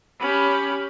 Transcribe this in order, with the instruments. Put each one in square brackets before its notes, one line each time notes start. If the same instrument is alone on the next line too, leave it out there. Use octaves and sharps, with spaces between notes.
[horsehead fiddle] C#4 G4 [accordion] B5